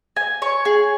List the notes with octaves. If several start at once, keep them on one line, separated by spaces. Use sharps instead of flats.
G#5
C#5
G#4